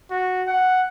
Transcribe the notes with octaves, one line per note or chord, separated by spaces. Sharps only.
F#4
F#5